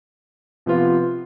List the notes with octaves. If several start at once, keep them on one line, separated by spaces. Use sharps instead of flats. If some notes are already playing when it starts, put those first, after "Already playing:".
C3 F3 B3 F4